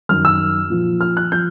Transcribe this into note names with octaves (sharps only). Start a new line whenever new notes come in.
F#2 D#3 F6
E6
A#2 F3
F6
F#6
F3 G6